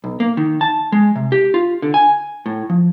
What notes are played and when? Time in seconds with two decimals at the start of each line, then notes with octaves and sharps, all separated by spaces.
0.04 B1
0.20 A#3
0.37 D#3
0.61 A5
0.92 G#3
1.16 C3
1.32 G4
1.54 F4
1.82 D3
1.94 G#5
2.46 A2
2.70 F3